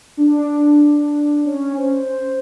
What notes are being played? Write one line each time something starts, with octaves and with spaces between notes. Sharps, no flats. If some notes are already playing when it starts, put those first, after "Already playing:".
D4
C#4
C5